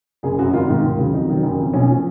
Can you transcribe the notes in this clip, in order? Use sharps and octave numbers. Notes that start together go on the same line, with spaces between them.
F#1 G#4
F#2 C#3 F#3 F#4
G#1 F4
G#2 D#3
D#2
C#3 F#3
F2 D#4
D#3 F#3
F#1
F2 F3
B1 C#4
A#2 F3